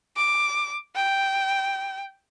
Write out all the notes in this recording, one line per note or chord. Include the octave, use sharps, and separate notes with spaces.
D6
G5